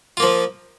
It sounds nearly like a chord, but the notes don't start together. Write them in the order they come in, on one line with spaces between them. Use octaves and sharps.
F4 A#3 F3